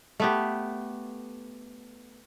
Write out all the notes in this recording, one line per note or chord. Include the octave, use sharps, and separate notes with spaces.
A3 B3 G4